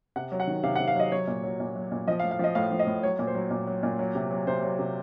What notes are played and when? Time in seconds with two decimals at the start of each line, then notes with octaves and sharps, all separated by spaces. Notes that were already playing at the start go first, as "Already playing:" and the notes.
0.16 C3 F#5
0.32 F#3
0.40 F#5
0.47 D#3
0.64 C3 F5
0.76 F#5
0.79 C3
0.88 F5
0.96 F#3 D#5
1.12 F#3 C#5
1.27 A#2
1.44 F#3
1.60 A#2
1.76 F#3
1.92 A#2
2.07 F3 D#5
2.20 F5
2.24 A2
2.31 F5
2.39 F3 D#5
2.55 A2 F5
2.71 F3
2.79 D#5
2.87 A2
3.03 F#3 C#5
3.19 A#2
3.27 C5
3.35 F#3
3.50 A#2
3.67 F#3
3.83 A#2
3.99 F#3
4.15 C3
4.31 F#3
4.47 C3 C5
4.63 F#3
4.79 C3